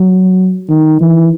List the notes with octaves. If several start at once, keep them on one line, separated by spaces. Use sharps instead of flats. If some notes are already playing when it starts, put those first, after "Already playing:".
Already playing: F#3
D#3
E3